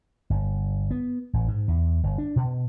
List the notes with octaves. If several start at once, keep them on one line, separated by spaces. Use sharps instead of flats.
G1
B3
A1
G#2
E2
G1
D4
B2